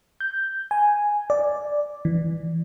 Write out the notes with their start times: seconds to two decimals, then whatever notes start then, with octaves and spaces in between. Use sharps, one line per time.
0.20 G6
0.71 G#5
1.30 D5
2.05 E3